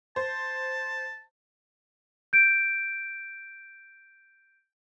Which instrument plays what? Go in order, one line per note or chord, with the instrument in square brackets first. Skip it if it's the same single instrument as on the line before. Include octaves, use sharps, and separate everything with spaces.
[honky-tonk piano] C5 [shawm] A5
[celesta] G6 D7